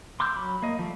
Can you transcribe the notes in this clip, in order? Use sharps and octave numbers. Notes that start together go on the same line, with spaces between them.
C6 D6 E6 F6 G6
F#3 B5
A#3 D#5
F3 G3 A3